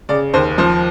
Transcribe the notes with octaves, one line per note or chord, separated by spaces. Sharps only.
C#3 D5
D#2 C5
F3 C5